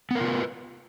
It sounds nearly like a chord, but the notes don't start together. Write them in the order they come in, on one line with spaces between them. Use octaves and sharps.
B3 A#4 F4 B4